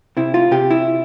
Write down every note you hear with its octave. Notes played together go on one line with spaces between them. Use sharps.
C3 E4
F4
C3 G4
E4